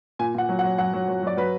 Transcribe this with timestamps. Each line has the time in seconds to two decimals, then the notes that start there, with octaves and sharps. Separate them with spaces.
0.19 A#2 G#5
0.35 A#2 F#5
0.49 F#3
0.59 F#5
0.63 F#3
0.78 F#3 F#5
0.93 F#3
1.08 F#3
1.23 F#3 D5
1.37 F#3 B4